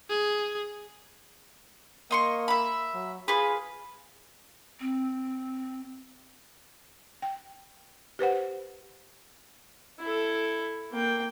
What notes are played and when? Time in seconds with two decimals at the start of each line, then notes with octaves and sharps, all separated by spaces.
0.10 G#4
2.11 A#3 D#5 C6 C#6
2.48 E5 B5
2.94 F#3
3.28 F4 G#4 B4
4.80 C4
7.22 G5
8.19 G4 B4 C5 F#5
9.99 E4 A4
10.91 A#3 G5